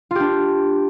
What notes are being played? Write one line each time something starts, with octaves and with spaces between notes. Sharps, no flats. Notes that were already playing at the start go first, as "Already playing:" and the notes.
D4 F4 G4